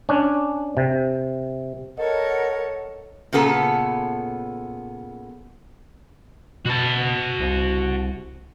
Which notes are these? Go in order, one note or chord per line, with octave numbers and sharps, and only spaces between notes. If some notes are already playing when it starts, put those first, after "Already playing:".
C#4 D4
C3
A4 A#4 C#5 D#5 F#5
A#2 C#3 B3 A4 A5
B2 F#4 A5
C2